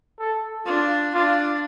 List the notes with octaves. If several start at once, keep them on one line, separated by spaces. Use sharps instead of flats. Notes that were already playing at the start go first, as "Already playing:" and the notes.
A4
D4 F4
D4 F4